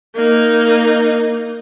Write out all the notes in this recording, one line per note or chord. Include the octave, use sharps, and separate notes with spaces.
A#3 D#4